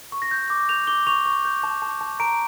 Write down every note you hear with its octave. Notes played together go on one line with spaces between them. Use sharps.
C#6
A#6
G6
D6
G6 F7
D6 G7
C#6 F7
C#6
G6
A5
A5
A5
A#5 D7